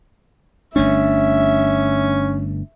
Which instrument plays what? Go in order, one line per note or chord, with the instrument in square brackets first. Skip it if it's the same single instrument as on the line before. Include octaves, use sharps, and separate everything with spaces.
[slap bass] G1 A3 D4 [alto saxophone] C#4 [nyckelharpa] E5